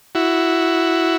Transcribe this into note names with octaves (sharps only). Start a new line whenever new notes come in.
E4 F#4